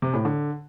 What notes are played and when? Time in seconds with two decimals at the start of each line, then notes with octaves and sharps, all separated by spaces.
0.02 C3
0.14 A2
0.25 D3